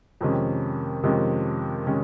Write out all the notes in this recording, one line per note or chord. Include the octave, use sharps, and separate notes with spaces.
F2 C3 D#3 G#3 C#4
F2 C3 D#3 G#3 C#4
C3 D#3 G#3 C#4